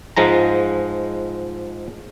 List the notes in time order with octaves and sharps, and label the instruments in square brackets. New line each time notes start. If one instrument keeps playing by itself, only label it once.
[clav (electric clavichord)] G#2 F3 G#3 A#5